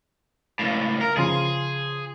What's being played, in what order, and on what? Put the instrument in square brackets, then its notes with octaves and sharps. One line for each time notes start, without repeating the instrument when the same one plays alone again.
[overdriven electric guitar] C#2 A2
A#4
[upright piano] C#3 F3 C6 [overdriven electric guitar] G#4